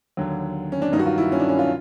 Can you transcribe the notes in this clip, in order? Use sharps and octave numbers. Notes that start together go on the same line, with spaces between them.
D#2 D3 F#3
C#4
D4
G2 D#3 F#3 D#4
F#4
F4
E4
C#4
D4
C#4
F4